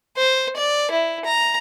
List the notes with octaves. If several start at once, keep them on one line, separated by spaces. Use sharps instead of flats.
C5
D5
E4
A#5